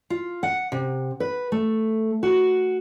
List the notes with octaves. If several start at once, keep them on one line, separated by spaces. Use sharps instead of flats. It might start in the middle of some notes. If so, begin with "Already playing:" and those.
F4
F#5
C3
B4
A3
F#4